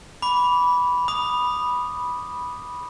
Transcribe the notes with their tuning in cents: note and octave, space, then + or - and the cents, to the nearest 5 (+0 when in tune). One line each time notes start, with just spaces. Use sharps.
B5 -5 D6 -25
B5 -10 D#6 -15